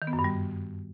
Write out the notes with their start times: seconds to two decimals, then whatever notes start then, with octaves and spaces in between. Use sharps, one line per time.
0.02 D#3
0.07 B3
0.13 F#2
0.19 G2
0.24 G3